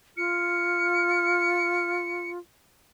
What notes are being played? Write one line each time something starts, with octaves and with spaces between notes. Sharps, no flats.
F4 F6 C#7